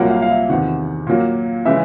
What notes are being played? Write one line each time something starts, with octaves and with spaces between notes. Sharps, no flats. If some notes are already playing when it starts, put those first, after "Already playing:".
Already playing: C2 A#2 F#3 A#3 F#5
F5
F5
E5
E2 C3 D#3 F#5
A#2 F#3 A#3
C#3 E3 G#3 E5